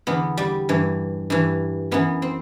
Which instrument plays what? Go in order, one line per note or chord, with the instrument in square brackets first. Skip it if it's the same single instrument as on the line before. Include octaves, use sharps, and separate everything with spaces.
[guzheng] E2 D3 B3
G3
G2 E3
G2 E3
F#2 E3 B3
C4